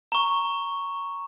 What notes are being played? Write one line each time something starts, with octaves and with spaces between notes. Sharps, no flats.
A#5 C#6